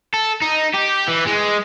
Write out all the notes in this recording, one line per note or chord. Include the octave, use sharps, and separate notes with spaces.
A4
D#4
G4
E3
G#3